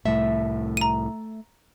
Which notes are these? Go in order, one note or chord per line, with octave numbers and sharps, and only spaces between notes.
C2 A2 A3 E5
A#5 D#7